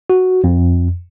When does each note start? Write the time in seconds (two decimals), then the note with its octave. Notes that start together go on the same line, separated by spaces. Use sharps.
0.10 F#4
0.44 F2